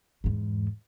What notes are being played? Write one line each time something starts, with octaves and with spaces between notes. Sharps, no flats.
E2 G#2